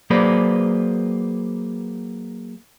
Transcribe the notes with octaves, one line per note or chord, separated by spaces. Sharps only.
F#3 A#3 G#4 B4 C5 D5